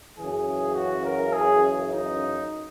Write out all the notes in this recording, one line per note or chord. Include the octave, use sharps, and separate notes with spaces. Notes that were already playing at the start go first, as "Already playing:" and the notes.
F#2 C#3 E3 G#4
F#4
A#4
G#4
D#4